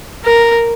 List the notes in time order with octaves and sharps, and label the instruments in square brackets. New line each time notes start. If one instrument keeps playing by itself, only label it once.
[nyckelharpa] A#4